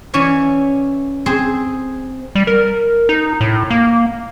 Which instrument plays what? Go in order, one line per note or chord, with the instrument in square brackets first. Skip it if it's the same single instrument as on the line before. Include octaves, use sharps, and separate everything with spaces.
[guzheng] E3 C#4 C#5 D5 E5
C4 G#4 C5
[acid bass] G3
A#4
D#4
A2
A#3